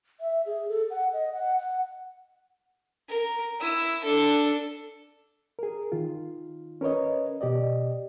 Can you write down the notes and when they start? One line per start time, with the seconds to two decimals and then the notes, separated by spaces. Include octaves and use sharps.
0.21 E5
0.46 G#4
0.69 A4
0.91 F#5
1.13 D#5
1.33 F#5
1.59 F#5
3.08 A#4
3.60 E4 E6
4.04 D4 A4
5.59 G#4 A#4
5.92 D#3 F4
6.81 C#4 A#4 B4 C#5 D#5
7.41 B2 G4 D5 D#5